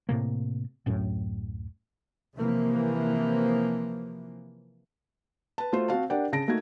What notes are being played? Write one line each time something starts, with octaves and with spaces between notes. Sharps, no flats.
A2 C3 A#3
D1 F#2 A2
C3 E3 F3 A#3
B4 A5
A3 F4 F#4 C5
C4 F#4 F5 A5
D4 G4 A#4 D5 F#5 G5
C#3 A5 A#6 D7
A3 A#3 D#4 F#4 G#6